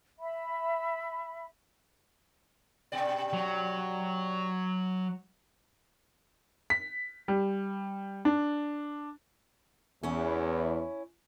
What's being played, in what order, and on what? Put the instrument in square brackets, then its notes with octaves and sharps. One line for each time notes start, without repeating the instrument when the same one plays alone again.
[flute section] E5 B5
[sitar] G2 B2 D5
[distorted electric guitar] F#3
[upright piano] B6
G3
D4
[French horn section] E2 [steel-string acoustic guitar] C#4 E4